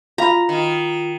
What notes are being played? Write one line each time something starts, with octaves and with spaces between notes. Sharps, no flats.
F4 F#4 F5 A#5 B5
D#3 F4